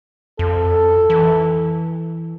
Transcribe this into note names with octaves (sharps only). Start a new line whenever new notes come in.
F2 A4
E3